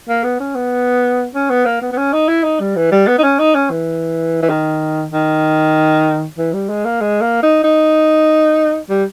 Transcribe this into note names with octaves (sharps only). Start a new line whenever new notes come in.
A#3
B3
C#4
B3
C#4
B3
A#3
B3
B3
C#4
D#4
E4
D#4
G3
E3
G3
B3
D#4
C#4
D#4
C#4
E3
E3
D#3
D#3
E3
G3
G#3
A#3
G#3
A#3
D#4
D#4
G3